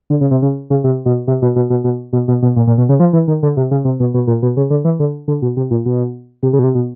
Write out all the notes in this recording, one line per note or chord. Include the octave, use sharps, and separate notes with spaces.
D3
C#3
C3
C#3
C#3
C3
B2
C3
B2
B2
B2
B2
B2
B2
B2
A#2
A#2
B2
C#3
F3
E3
D#3
D3
C3
C#3
C3
B2
B2
A#2
B2
C#3
D3
E3
D3
D3
B2
C3
A#2
B2
C3
C#3
B2
C3
B2